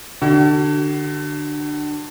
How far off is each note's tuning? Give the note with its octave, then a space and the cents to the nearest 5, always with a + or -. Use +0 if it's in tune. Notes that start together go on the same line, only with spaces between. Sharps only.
D3 +20 F#4 +40